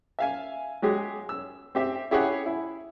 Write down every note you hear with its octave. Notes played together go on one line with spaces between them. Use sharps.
E5 F5 G#5
F#3 G#3 G4 G#4
E6
C4 G4 E5
E4 G4 G#4 C#5 F#5
E4